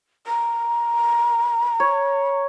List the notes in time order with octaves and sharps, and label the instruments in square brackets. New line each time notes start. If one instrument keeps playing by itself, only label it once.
[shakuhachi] A#5
[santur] C#5